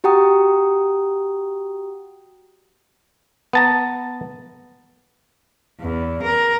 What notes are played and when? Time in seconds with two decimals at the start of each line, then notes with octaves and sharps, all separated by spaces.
0.04 F#4 G4 F#5 G5 A#5 D#6
3.53 B3 A5 A#5
5.80 E2
6.22 A#4